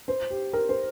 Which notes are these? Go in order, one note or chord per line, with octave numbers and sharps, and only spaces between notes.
C5
G4
A#4
C5